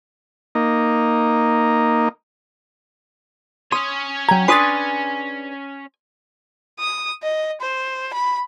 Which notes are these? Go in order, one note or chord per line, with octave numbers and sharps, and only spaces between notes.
A#3 D#4
C#4 C#5 C6 D#6
F#3 G5 A#5 G#6
D4 G#4 B4 G#5 C6 D#6 A6
D#6
D#5
C5
B5